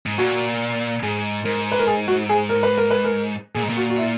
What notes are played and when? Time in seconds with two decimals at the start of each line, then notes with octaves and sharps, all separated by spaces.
0.06 G#2
0.18 A#2 F#4
1.03 G#2 G#4
1.44 G#2 A#4
1.72 B4
1.79 A#4
1.87 G#4
2.08 F#4
2.29 G#4
2.49 A#4
2.63 B4
2.77 A#4
2.91 B4
3.04 A#4
3.55 A#2 G#4
3.63 G#2
3.69 A#2
3.77 F#4
3.90 F#4
3.98 E4